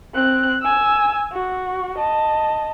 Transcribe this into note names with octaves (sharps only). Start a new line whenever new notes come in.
C4 F#6
G#5 E6
F#4
D#5 A5